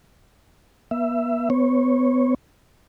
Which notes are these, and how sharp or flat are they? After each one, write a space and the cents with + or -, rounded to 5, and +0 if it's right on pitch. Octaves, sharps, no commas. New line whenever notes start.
B3 -40 E5 +20
B3 +30 C#5 -15